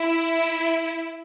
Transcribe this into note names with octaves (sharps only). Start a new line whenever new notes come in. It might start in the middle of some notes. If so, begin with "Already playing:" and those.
Already playing: E4